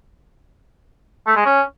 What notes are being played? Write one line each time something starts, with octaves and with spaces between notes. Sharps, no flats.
A3
G#3
C#4